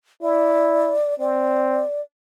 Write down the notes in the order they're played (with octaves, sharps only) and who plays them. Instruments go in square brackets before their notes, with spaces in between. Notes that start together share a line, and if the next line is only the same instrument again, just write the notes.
[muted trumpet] E4 [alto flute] D5
[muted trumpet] C4 [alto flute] D5